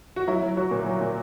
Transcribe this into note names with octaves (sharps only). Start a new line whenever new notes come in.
F#4
F#3 E4
F#3
F#3 F#4
A#2
F#3
A#2